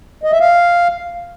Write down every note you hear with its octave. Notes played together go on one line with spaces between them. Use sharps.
D#5
E5
F5